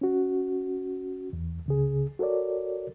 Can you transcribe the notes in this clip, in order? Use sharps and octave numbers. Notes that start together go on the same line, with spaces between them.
C#4 F#4
E2
C#2 C#3 G#4
F#4 A4 A#4 C#5 D5